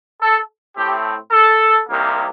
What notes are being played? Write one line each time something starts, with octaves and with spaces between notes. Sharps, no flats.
A4
A2 A3 C4 G4
A4
C2 C3 D#3 A#3